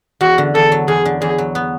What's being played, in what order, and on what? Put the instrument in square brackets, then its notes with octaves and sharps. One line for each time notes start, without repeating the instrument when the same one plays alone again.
[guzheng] E2 [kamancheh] F#4
[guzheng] D3
[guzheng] E2 [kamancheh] A4
[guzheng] F#3
[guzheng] E2 [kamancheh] G#4
[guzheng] D3
[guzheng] E2 [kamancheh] G#4
[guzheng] F#3
B3